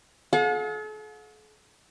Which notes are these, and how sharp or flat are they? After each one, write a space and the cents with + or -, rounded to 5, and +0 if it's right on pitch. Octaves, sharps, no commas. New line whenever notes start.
A4 -45 F#5 -45